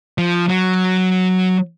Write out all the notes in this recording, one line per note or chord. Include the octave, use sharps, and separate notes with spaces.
F3
F#3